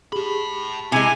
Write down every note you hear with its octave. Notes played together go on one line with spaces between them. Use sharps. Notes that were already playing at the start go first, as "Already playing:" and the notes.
G4 G#4 A5 B5
C3 G#3 E4 G#5